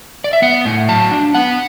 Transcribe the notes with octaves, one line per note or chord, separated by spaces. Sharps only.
D5
E5
B3 F#5
A2
F#3 A5
D4
B3 F#5